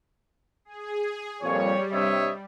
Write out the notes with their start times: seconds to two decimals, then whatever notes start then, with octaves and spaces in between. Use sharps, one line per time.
0.65 G#4
1.42 F2 A#2 G3 C#5
1.93 G2 C3 C#5 D#5 E5